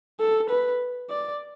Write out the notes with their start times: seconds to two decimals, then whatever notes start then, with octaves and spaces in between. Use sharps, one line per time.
0.20 A4
0.50 B4
1.10 D5